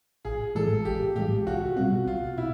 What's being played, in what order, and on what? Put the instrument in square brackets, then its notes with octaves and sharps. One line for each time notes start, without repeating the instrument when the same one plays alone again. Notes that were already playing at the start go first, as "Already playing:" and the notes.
[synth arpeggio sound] A1 [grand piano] G#4
[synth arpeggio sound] A2 E3 G#3 [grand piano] A4
[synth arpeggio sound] A1 [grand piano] G4
[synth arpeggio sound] A2 E3 G#3 [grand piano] G4
[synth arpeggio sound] C2 [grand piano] F#4
[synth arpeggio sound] B2 G3 C4 [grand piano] F#4
[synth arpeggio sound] C2 [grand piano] F4
[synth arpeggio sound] B2 [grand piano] E4